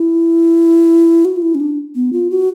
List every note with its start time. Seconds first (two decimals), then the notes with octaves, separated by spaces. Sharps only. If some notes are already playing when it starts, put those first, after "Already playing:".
Already playing: E4
1.25 F#4
1.37 F4
1.42 E4
1.55 C#4
1.60 D4
1.95 B3
2.13 F4
2.30 F#4